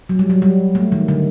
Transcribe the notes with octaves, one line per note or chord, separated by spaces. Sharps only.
F#3
G3
F#3
G3
A3
D#3
D3